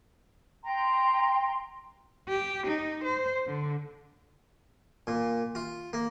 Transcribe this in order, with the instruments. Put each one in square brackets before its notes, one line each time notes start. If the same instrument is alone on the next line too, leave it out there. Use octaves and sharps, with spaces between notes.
[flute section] G5 A#5 C6
[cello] G4
D#4
C5
D3
[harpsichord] A#2
F4
A#3